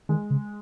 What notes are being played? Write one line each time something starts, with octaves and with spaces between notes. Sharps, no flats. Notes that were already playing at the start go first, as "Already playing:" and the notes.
D#3 G#3
C#3